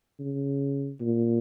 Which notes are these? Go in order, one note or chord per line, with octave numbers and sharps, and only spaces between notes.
C#3
A#2